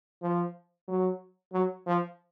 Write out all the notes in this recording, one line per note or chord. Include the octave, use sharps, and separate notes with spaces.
F3
F#3
F#3
F3